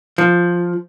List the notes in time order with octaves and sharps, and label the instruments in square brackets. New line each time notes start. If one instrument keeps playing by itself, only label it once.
[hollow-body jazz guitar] F3